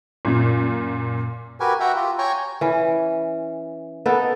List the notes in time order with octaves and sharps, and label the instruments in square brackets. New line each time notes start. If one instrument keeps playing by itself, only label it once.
[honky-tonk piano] F#2 A#2
[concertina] F#4 G4 A#4 B4 G#5
F#4 E5 F#5 G5 A#5
F4 G4
C#5 G5 G#5 A#5 C#6
[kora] E3 C#4
B3 D#4 A4 A#4